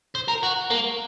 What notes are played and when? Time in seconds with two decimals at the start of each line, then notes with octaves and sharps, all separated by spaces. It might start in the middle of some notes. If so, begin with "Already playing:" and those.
0.15 C5
0.28 A#4
0.43 F#4
0.70 A#3